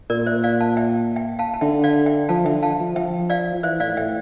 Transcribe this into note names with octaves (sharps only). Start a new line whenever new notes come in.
A#2 A#4 D5
C5 E5
D5 F5
F5 A5
E5 G5
E5 G5
F5 A5
A5
D3 E5 G5
D5 F5
E5 G5
F3 F5 A5
D3 E5 G5
F5 A5
F3
F3 E5 G5
D5 F5
F3
E3 C5 E5
A2 D5 F5
A2 E5 G5